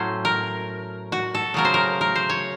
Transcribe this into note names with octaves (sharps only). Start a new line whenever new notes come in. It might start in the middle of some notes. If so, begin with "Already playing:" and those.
Already playing: A2 F#3 A3 C#4 C5
A#4
F#4
A4
C#3 F#3 A3 A#4
C5
A#4
A#4
C5
C#5